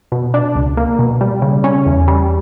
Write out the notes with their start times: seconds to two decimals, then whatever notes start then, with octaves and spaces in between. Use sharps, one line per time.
0.12 B2
0.34 D4
0.55 C#2
0.77 A#3
0.99 B2
1.21 G3
1.42 C#3
1.64 C#4
1.86 E2
2.08 G3